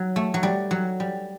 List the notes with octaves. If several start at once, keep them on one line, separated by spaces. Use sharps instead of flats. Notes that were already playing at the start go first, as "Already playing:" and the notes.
Already playing: F#3
A3
F#3
G3
F#3
G3